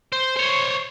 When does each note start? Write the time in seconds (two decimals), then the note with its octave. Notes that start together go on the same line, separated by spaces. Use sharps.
0.13 C5
0.37 C5 C#5